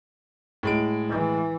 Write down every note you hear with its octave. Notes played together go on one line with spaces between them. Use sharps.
A2 G#3 D7
E3